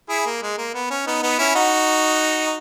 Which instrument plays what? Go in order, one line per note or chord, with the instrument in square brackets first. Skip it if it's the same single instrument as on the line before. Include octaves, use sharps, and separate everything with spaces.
[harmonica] E4 G#4
A#3
G#3
A#3
B3
C#4
B3 D#4
B3 D#4
C#4 E4
D#4 F#4